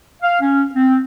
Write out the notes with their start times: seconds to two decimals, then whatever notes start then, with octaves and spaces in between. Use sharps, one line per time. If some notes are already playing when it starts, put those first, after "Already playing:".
0.22 F5
0.41 C#4
0.74 C4